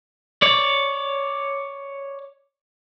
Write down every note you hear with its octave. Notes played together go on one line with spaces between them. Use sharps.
C#5 D5